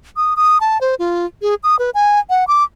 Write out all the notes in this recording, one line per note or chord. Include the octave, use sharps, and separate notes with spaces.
D#6
D#6
A5
C5
F4
G#4
D#6
B4
G#5
F#5
D6